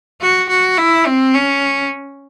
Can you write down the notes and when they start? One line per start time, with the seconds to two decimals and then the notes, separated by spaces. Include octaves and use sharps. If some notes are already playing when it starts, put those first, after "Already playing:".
0.21 F#4
0.49 F#4
0.78 E4
1.06 C4
1.35 C#4